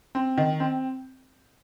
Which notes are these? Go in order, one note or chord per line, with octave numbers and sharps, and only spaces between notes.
C4
D#3
C4